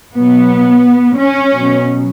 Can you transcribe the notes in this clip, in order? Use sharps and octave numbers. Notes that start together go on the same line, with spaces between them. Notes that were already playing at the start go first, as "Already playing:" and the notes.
B2 F#3 B3
C#4
B2 F#3